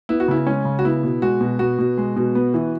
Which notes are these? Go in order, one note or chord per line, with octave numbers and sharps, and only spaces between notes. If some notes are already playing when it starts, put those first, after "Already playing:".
B3 E4
F#4
C#3 E4
G#3 C#4
C#3
F#4
B3 E4
B2
G#3 F#4
B2
B3 F#4
B2
G#3
B2
B3
E3